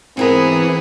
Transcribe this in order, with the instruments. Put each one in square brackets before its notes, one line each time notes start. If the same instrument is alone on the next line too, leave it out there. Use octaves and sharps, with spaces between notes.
[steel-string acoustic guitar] G#2 E4 A#4 [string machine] E3 [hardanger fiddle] B3 G#4 [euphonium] C4